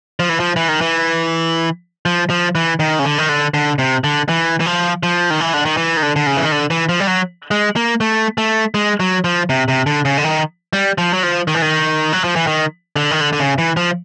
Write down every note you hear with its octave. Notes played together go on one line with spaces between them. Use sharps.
F3
E3
F3
E3
D#3
E3
F3
F3
E3
D#3
C#3
D3
D#3
D3
D3
C3
D3
E3
E3
F3
F3
D#3
E3
D3
D#3
E3
D#3
D3
D3
C#3
E3
D#3
D3
E3
F3
G3
F#3
G#3
A#3
A3
A3
G#3
F#3
F3
C3
C3
D3
C#3
D3
D#3
G3
F3
F#3
F3
D#3
E3
D#3
F#3
F3
E3
D#3
D3
D#3
D3
D3
C#3
E3
F3